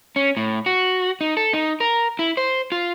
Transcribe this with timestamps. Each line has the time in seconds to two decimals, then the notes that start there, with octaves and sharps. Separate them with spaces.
0.16 C#4
0.37 A2
0.66 F#4
1.21 D#4
1.37 A4
1.53 D#4
1.80 A#4
2.19 E4
2.37 C5
2.72 F4